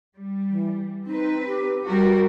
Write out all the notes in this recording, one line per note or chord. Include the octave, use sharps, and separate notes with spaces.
G3
E3
C4 D#4 B4
G4
G3 F#4 A#4